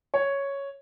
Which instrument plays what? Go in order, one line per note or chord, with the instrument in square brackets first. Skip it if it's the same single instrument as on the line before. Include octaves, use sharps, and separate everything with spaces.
[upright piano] C#5